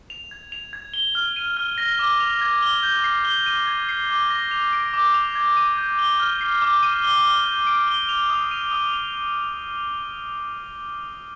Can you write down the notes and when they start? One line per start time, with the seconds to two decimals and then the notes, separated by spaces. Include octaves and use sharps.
0.10 F7
0.31 G#6
0.52 F7
0.73 G#6
0.94 G7
1.15 F6
1.36 D#7
1.57 F6
1.78 A#6
1.99 D6
2.20 F7
2.41 G#6
2.62 G7
2.83 G6
3.04 C7
3.25 G7
3.46 D#7
3.67 G#6
3.89 C7
4.09 D6
4.31 A#6
4.51 F7
4.73 D7
4.93 D6
5.14 F7
5.35 G#6
5.57 D#7
5.77 G6
5.99 G7
6.20 F6
6.41 C7
6.62 D6
6.83 D#7
7.04 G7
7.24 G7
7.46 G6
7.67 D7
7.88 G7
8.09 F7
8.30 D#6
8.51 D#7
8.71 D#6
8.93 F7